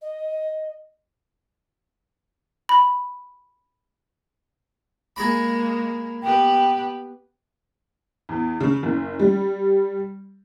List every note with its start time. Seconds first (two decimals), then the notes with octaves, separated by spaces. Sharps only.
0.01 D#5
2.69 B5
5.16 G#3 A#3 G#4 A#5 B5
6.22 B3 G4 B4 G5
8.29 E2
8.60 C#3
8.83 F#1
9.19 G3